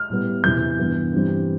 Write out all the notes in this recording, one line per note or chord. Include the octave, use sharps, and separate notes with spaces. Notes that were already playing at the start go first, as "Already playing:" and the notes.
Already playing: F6
A2 G3 B3
E2 C3 E3 G6
G2 E3 B3
G2 E3 G3 C4